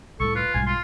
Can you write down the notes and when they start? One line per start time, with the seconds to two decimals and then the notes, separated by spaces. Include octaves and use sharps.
0.20 C2 A2 A4 C#6
0.35 F4 B4
0.54 B1 G#2 G3 G#5
0.67 F4 C6